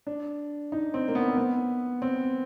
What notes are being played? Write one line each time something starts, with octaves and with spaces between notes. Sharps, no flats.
D4
D#4
C4
A#3
B3
C4
B3
C4